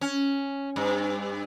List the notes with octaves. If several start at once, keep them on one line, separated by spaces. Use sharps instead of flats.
C#4
G2